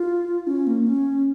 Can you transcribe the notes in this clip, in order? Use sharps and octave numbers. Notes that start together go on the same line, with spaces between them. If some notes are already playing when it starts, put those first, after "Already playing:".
Already playing: F4
C#4
A#3
C#4